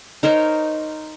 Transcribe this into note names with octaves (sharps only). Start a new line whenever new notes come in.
D#4 A#4 C5 C#5